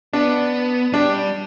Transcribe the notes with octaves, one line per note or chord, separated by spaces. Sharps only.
B3 D4
G3 D4